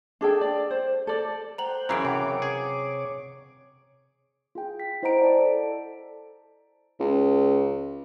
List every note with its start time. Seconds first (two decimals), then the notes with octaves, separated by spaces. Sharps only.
0.21 D4 G#4 A4 G5
0.41 D5
0.71 C5
1.07 A4 D5
1.58 C5 F#5 G5 A#5 F#7
1.89 F#2 C#3 E3 A#5 C7 D7
2.05 C3 C#5 F#5 G5 A#5 D6
2.42 G#4
4.55 F4 G#4 G5
4.80 B6
5.03 E4 C5 D#5 F#5 A#5 D7
5.21 D5 A5
5.39 A4
7.00 C#2